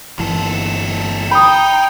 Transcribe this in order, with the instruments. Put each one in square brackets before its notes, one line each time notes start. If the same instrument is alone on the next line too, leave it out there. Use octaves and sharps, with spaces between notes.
[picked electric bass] G1 E3 [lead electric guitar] A#3 A4
[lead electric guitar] D#4 [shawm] G5 [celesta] B5 D#6